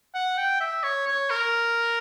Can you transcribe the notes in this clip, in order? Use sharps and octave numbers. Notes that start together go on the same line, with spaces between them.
F#5
G5
E5
C#5
C#5
A#4